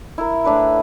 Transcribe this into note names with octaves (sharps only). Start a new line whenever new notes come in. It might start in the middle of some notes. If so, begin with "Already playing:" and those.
E4 A#4
A2 D4 B4 B5